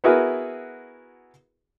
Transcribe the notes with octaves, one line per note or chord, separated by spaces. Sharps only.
B3 E4 F#4 G#4 A#4 B4